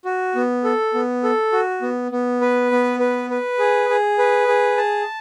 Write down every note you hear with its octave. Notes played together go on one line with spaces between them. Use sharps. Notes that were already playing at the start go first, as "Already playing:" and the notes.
F#4
B3
A4
B3
A4
F#4
B3
B3
B4
B3
B4
B4
G#4
G#4
B4
G#4
A5